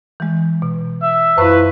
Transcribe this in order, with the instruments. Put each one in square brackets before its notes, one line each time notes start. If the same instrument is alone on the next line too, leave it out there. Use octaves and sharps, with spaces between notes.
[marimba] E3 G#3
B2
[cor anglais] E5
[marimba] F#2 C5 C#6 [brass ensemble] E4 F4 B4